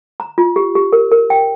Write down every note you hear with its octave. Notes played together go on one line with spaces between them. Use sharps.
A#5
F4
G4
G4
A#4
A#4
G5